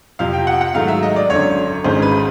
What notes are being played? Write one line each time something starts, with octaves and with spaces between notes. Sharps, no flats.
F2 C3 F3 F5
G5
F#5
F#5
G#2 D#3 F#3 A3 F5
E5
D#5
D5
G#1 F#2 D3 C#5
G#1 G#2 D#3 G#3 C#4 C5
B4